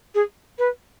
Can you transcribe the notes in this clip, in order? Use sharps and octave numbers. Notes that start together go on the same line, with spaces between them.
G#4
B4